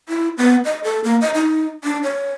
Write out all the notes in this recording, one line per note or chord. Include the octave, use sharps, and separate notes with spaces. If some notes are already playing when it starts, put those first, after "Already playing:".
E4
B3
D#5
A4
A#3
D#5
D#4
D4
C#5